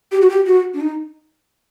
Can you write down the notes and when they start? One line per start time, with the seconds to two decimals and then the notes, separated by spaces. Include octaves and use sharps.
0.12 G4
0.21 F#4
0.30 G4
0.46 F#4
0.74 D4
0.81 D#4